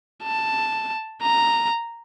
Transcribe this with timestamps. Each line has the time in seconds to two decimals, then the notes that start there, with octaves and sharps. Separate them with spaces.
0.24 A5
1.22 A#5